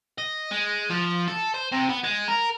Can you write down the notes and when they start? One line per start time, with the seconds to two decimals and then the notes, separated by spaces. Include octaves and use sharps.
0.18 D#5
0.51 G#3
0.90 F3
1.28 A4
1.54 C5
1.72 C3
1.89 B3
2.04 G#3
2.28 A#4